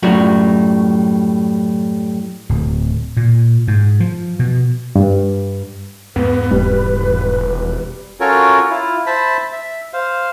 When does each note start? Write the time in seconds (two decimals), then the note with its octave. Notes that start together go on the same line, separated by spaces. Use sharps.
0.03 F#2 A2 F#3 G3 F4 F#4
2.49 D1
3.17 A#2
3.68 G#2
4.00 F3
4.39 B2
4.96 G2
6.16 E2 G#2 B3 B4
6.51 E1 G3
8.20 C#4 F4 F#4 A4 A#4 C#5
8.70 E4 F4
9.06 C5 E5 A5 B5
9.53 E5
9.93 C5 F5